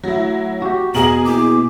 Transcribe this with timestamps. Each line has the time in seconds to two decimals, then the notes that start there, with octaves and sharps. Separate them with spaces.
0.04 F#3 A3 E4
0.62 F#4 G4
0.95 E2 B2 G#4 A#5 F#7
1.25 A#3 B3 E4 D6